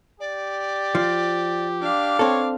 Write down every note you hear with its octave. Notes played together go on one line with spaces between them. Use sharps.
G4 D5
F3
D4 F5 D6
C4 A4 C#5